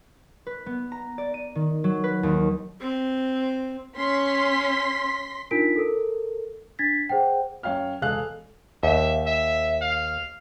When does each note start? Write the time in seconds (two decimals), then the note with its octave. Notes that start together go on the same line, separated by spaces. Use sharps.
0.47 B4
0.66 B3
0.92 A#5
1.18 D5
1.34 D#7
1.55 D#3
1.84 F#3
2.04 B4
2.23 D#2
2.81 C4
3.98 C#4 C6 B6
5.51 D4 D#4 F4 A#4 B6 D7
5.76 A4 A#4
6.79 D4 G#6 A6 B6
7.09 G#4 C5 F#5 G5
7.63 F#2 C#5 F5 G5 F6
8.02 E1 G#3 G#4 A4 F5 F#6
8.83 D#2 E5
9.26 E5
9.81 F5